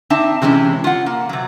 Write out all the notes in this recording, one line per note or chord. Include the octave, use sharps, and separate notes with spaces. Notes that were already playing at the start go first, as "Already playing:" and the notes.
C4 D4 D#4 E5 A5
C3 E3 G#3 C4 C#4
F4 F#5
A#3
C3 F#3